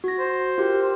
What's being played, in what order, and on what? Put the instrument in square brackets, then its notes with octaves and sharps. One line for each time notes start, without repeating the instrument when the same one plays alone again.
[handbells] F#4 A#6
[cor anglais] C5
[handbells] F4 G4 A#4